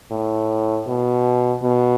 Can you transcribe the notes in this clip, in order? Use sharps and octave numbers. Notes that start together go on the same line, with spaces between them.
A2
B2
B2